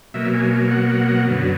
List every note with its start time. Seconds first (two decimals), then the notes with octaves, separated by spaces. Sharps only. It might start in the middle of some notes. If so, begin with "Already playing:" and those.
0.14 B2 F#3 A#3 E5
0.34 G#5
0.71 F#5
0.90 F#5
1.08 F#5
1.27 F#2 D3 F#3 B3